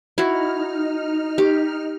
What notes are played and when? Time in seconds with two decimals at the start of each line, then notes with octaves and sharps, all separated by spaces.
0.18 D#4 E4 F#4 F6
1.38 G4